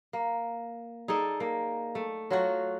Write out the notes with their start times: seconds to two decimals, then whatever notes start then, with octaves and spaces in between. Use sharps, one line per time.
0.13 A#3
1.08 D#4 G#4 A4 D5
1.40 A#3
1.95 A3
2.31 F#3 F4 F#4